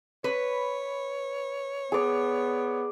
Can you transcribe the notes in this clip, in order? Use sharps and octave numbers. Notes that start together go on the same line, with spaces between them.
B4 C#5
B3 G#4 D5